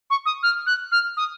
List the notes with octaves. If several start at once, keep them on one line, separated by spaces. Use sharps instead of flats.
C#6
D#6
F6
F#6
F6
D#6